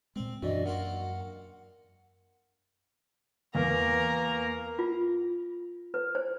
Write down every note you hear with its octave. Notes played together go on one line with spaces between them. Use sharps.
A#2 G#3 C4
F#2 E3 D4 F#4 D5 D#5
A#3 F4 F#4 F#5
E2 A#3 A#4 A#5
F4
B4
C5